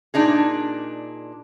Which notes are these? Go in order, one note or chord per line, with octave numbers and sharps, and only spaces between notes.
A#2 D4 D#4 G#4